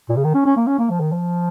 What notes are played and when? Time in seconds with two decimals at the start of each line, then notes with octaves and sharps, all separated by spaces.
0.09 A#2
0.17 C#3
0.24 D#3
0.34 C#4
0.45 C#4
0.57 A#3
0.67 C#4
0.79 A#3
0.90 F3
1.00 D#3
1.12 F3